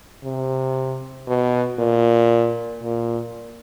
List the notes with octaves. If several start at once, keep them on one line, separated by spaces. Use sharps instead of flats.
C3
B2
A#2
A#2